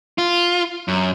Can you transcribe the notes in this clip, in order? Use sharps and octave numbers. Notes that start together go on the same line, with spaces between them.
F4
F#2